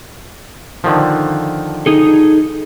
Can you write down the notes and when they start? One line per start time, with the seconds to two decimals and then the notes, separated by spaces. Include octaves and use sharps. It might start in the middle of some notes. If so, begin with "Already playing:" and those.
0.84 D3 D#3 F3
1.86 D#4 G#4 A4